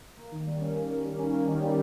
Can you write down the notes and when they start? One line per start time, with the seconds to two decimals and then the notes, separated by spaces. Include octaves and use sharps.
0.16 A#3
0.31 D#3
0.46 G3
0.60 C#4
0.75 A#3
0.89 D#3
1.04 G3
1.18 C#4
1.33 A#3
1.48 D#3
1.62 G3